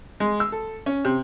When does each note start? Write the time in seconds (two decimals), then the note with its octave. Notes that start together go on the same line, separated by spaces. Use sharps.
0.20 G#3
0.40 E6
0.52 A4
0.86 C#4
1.05 C3